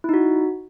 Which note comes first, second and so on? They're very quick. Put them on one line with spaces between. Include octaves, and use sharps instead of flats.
E4 D#4 F#4